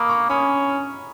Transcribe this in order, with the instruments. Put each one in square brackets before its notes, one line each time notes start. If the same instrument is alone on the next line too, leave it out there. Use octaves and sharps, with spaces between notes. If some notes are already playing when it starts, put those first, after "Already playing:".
Already playing: [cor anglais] A#3 [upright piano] B5 D#6
[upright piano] A#5 C#6
[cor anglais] C#4 [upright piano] B5 D#6